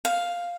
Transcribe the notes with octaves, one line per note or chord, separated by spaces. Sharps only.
F5